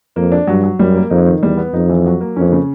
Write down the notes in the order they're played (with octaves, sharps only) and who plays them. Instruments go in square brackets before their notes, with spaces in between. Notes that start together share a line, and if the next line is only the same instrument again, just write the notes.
[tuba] F2 [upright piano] A#3
[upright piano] D4
[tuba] G2 [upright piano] F#3
[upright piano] F#3
[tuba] F#2 [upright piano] G3
[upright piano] A#3
[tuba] F2 [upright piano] D#4
[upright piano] D#3
[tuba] E2 [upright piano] G3
[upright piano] B3
[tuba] F2 [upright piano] D#4
[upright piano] E3
F#3
A#3
[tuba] F2 [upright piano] C#4
[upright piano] C#3